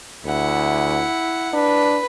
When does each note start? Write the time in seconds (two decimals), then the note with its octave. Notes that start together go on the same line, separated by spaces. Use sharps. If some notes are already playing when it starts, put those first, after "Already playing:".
0.25 D2 E4 F#5
1.53 D4 B4